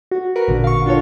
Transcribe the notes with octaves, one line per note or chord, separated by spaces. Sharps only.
F#4
F#4 A#4 B4
A1 A#2 D3
F5 C#6
D4 F4 F#4 A4 C#5